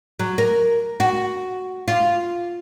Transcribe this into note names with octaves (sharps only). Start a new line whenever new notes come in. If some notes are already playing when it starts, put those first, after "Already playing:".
F#3
A#4
F#4
F4